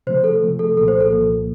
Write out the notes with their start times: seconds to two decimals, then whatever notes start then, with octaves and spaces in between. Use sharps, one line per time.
0.07 C3 F3 A3 C5
0.24 A4
0.42 C3 F3 A3
0.59 A4
0.77 C2 A#2 F3 A#3 A4
0.88 C5
1.01 A4
1.12 C2 A#2 F3 A#3